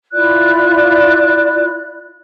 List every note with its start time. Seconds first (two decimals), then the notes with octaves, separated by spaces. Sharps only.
0.13 E4 F4 D5 F#6